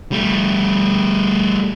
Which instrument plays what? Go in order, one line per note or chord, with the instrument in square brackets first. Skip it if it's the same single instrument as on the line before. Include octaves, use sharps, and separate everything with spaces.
[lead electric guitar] G3 A3